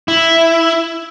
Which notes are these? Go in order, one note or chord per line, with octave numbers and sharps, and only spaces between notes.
E4